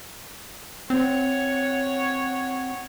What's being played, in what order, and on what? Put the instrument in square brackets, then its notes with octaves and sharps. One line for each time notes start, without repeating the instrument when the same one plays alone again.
[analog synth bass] C4 [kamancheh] C#5 F#5